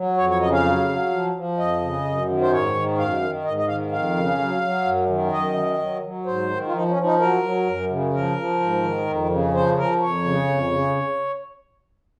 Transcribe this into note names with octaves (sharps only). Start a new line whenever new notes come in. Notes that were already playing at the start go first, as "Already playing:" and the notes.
Already playing: F#3
F2 C#5
C#5
C#3 D#5
F5
F#3
F#3
F3
F3
F2 D#5
C#3
F#2
D#3
C5
G#2 C#5
D#3
F#2 F5
D#3
G#2 D#5
D#5
D#3 F5
F2 F5
C#3
F#3
F#3
F#2
D#3
F#2 D#5
D#3
F#3
F#3
G#2 C5
D#3
F4
F3 D#4
C#4
F3
D#4
F#3 A#4
F#3
F#2
C#3
F3 A#4
F3
G#2
D#3
F2
C#3
F3 C5
F3 A#4
F2 C#5
C#3
F2
C#3